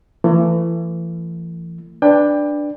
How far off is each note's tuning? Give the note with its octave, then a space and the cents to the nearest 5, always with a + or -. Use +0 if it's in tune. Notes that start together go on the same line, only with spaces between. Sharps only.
E3 +35 A3 +40
D4 +5 B4 +0 G5 +25